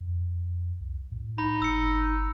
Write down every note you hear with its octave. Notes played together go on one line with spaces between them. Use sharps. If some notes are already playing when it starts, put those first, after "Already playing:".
F2
C2
A2
D#4 B5
G1 E6 C#7